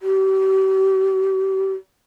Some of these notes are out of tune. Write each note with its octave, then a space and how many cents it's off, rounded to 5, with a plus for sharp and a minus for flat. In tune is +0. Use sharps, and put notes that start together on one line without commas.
G4 -40